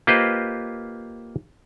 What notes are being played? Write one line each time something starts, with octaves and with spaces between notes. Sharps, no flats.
A#3 F4 G4 B4 C5 D#5